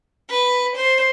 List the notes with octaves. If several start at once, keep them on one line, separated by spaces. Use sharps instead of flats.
B4
C5